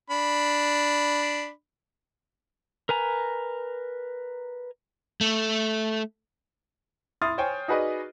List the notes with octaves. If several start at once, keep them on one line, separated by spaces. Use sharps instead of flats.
D4 B5
A#4 B4 G#5 A#5
A3
E4 C6 D#6 F6 A6
C5 C#5 G5 G#5
D#4 F#4 G#4 B4 D5 D#5